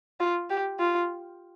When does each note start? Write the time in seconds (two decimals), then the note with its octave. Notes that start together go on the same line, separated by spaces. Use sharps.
0.20 F4
0.49 G4
0.80 F4